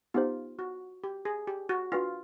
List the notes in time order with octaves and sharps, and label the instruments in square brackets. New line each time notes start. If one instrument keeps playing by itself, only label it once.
[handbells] B3 D#4 G4 C5 [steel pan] F4
[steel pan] F#4
G4
G#4
G4
F#4
[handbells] D4 F#4 B4 D5 F5 [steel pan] F4